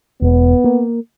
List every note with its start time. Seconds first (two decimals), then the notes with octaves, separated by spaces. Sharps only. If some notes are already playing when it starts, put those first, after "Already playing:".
0.22 E1 B3
0.64 A#3